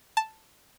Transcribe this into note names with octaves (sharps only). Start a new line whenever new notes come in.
A5